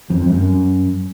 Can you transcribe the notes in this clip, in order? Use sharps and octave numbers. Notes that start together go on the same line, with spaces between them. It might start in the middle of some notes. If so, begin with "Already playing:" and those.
F2
F#2